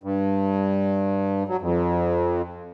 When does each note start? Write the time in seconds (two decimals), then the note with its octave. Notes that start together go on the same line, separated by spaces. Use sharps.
0.03 G2
1.49 F#3
1.61 F2